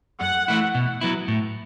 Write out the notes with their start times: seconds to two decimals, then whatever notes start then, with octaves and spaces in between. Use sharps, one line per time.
0.21 F#2 F#5
0.48 E3 A3 E4
0.75 B2
1.01 F#3 B3 E4
1.28 A2